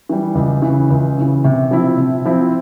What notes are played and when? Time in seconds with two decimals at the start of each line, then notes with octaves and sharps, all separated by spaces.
0.09 E3 G3
0.35 C#2
0.62 C#3 E3
0.90 C#2
1.16 C#3 E3
1.44 C3
1.71 F3 C4 E4
1.98 C3
2.25 F3 C4 E4